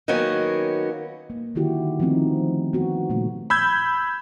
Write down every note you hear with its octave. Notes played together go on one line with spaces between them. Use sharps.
D#3 F#3 A#3 B3 C#4
A#3
D3 D#3 E4 F#4 G4
F3 A3 B3 C4 D#4
B3 F#4
A#2 C#3 G3 A3 A#3
B5 E6 G6 G#6